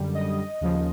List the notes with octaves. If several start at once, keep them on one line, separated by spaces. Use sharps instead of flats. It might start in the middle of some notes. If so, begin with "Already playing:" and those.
Already playing: F#2 D3 G3
D#5
D#2 C#3 F3